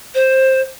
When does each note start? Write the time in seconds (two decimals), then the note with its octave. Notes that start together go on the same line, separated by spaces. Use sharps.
0.14 C5